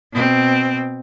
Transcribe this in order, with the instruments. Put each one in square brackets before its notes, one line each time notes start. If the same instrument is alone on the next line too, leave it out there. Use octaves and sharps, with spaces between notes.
[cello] B2 C4